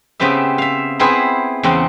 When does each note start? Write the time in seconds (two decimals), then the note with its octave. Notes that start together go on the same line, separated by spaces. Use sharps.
0.20 C#3 B3 C4 G4 E5
0.58 E5 F5
0.99 B3 C4 E4 G#4 B4 C5
1.63 E2 C#3 C4 F#5